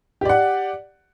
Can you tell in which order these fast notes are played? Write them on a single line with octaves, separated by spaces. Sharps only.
G4 D5 F#5